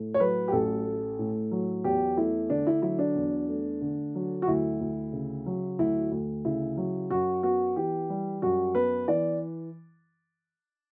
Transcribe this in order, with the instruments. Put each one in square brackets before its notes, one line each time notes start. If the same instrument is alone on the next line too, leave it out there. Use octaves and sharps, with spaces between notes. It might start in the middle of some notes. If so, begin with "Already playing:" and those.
Already playing: [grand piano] A2 A3
C#5
F#3 B4
G4
A1 A4
A3
A2
F#3
E2 G4
A3 E4
D3 D4
E4
F#3 E4
D4
E2
A3
D3
F#3
F#4
D2 E4
D2
C#3
F#3
D2 E4
D2
C#3 E4
F#3
F#2 F#4
B3 F#4
E3 G4
G3
F#2 F#4
B3 B4
E3 D5